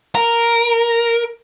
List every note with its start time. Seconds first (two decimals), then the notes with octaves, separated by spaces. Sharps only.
0.15 A#4